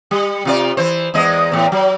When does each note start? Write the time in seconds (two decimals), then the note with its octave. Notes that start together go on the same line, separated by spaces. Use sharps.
0.11 G3
0.45 C3 F4 D5
0.77 E3 C5
1.14 E2 G#3 D#5
1.52 E2 A2
1.72 F#3